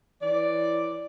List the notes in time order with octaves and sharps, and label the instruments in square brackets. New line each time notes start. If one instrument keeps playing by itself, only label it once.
[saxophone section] E3 C#5 D5